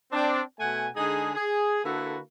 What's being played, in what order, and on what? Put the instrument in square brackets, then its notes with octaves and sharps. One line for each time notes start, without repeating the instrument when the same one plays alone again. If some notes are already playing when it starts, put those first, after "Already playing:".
[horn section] C4 D4
B2 A3 F#5 G#5
D3 G#3 D#4 G#4
G#4
D3 A#3 E4 F#4 A4 B4